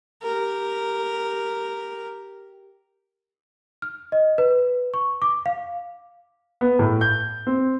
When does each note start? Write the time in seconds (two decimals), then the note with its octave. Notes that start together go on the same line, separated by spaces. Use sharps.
0.23 G4 A#4
3.82 F6
4.12 D#5
4.38 B4
4.94 C#6
5.22 D6
5.46 F5
6.61 B3
6.79 A2
7.01 G6
7.47 C4